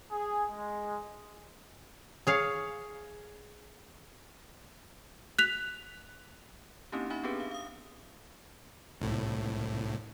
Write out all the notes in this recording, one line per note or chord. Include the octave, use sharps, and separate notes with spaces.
G#4
G#3
G#4 C#5 F5
F#6 B6 F7
A#3 C4 C#4 D#4 E4 G4
C#4 D#4 E5 B5
B3 C4 D4 G4 G#4 B4
F5
F5 D#6
C2 A2